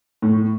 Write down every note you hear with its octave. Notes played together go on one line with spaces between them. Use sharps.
A2